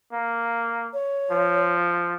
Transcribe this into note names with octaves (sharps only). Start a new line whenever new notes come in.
A#3
C#5
F3